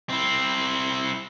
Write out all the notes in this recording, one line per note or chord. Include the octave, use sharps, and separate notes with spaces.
C4 E4